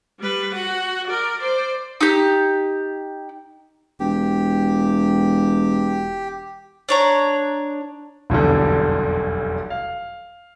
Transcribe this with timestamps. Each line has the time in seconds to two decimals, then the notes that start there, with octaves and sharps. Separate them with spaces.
0.20 G3 B4
0.54 F#4 F#5
1.07 A#4 D5
1.41 C5 D5
2.01 D#4 G4
4.00 E1 G4
6.89 D4 C#5 A#5
8.30 F1 B1 E2 G2 D3
9.70 F5